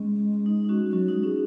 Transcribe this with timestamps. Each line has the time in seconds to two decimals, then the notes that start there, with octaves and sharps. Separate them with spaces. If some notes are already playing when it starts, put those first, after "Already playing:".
Already playing: G#3 C#4
0.46 D#4
0.64 D#4
0.69 C#4 F#4
0.87 G#3
0.92 F#3 C#4 F#4
1.08 G#3 D#4
1.23 C#4 G#4